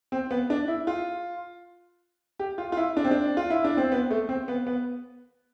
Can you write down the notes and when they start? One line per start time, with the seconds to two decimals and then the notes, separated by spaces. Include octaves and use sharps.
0.12 C4
0.31 B3
0.50 D4
0.68 E4
0.87 F4
2.39 G4
2.58 F4
2.72 F4
2.77 E4
2.97 D4
3.05 C4
3.11 D4
3.37 F4
3.50 E4
3.64 D4
3.77 C4
3.92 B3
4.11 A3
4.29 C4
4.48 B3
4.67 B3